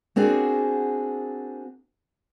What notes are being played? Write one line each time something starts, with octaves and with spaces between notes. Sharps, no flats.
A#3 C4 D4 F#4 G#4